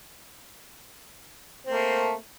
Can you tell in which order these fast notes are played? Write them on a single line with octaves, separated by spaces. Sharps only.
C4 A3 A#3